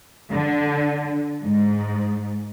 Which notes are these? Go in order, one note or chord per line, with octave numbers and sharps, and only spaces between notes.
D3
G#2